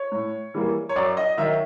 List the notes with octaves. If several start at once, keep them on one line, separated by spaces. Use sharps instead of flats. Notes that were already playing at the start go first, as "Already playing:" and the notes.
Already playing: C#5
A2
E3 G3 A#3
C#5
F#2 D5
D#5
D#3 F#3 E5